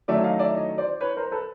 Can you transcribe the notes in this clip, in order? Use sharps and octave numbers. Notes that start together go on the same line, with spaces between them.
D#3 F#3 A3 C#4 D5 E5
D#5 F5
D5 E5
C#5 D#5
C5 D5
B4 C#5
A#4 C5
A4 B4